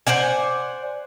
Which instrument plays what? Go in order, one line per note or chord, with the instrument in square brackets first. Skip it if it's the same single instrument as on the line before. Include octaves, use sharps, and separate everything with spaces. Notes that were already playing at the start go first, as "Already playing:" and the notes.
[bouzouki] C5 D5 F#5 G#5